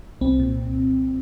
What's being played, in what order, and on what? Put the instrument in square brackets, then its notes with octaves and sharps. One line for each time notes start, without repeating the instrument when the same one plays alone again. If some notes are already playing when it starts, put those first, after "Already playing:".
[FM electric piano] C2 C4
A#2